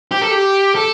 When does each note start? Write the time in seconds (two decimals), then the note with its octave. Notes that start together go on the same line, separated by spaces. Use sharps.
0.11 G4
0.22 A4
0.31 G4
0.75 A4